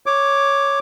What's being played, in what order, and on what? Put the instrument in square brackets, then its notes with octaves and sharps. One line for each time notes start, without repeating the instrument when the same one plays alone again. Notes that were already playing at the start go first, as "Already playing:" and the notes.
[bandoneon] C#5 D6